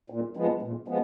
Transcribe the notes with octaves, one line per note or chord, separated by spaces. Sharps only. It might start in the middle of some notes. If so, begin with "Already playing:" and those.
A#2
F3 G#3 B3
A#2
F3 G#3 B3